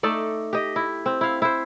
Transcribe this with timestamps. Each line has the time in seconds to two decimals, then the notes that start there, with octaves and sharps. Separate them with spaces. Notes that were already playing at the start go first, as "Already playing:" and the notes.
0.03 A3 D#4 A4 D5
0.53 G4 D#5
0.76 E4
1.06 C4
1.21 E4 F5
1.42 E4 C5